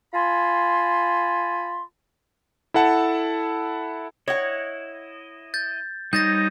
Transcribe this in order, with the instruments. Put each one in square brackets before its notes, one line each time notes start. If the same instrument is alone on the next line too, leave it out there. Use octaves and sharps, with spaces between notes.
[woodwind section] F4 G#5 A5 B5 C6
[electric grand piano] E4 A4 F#5 A5
[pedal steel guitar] E4 D#5 [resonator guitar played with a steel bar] C#5 F#5
[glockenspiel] G6 A6
[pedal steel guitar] G3 C5 C#5 [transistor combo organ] D#4 [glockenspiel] G6 A6 A#6